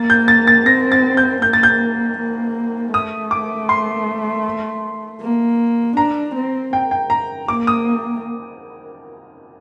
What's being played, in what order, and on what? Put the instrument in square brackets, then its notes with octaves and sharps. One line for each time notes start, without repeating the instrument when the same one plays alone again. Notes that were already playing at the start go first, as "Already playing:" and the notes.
Already playing: [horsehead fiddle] A#3 [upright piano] A6
[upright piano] G6
A6
A6
[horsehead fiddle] C4 [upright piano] A#6
[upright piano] A6
G6
[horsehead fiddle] A#3 [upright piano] G6
[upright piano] A6
G6
[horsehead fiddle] A#3
[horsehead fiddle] A3 [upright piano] D#6
[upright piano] D6
C6
[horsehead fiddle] A#3
[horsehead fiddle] D4 [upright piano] A#5
[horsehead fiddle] C4
[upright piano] G5
G5
A#5
[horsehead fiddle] A#3 [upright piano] D6
[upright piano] D#6